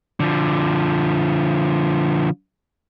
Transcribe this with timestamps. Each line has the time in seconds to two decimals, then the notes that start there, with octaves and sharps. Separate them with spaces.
0.20 D3 F3